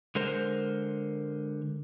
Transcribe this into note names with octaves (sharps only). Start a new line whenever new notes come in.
D3 G#3 A#4 C5